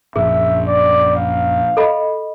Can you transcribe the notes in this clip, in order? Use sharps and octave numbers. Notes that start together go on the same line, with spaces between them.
A#1 F#2 G#4 E5
D5
F5
A4 D#5 B5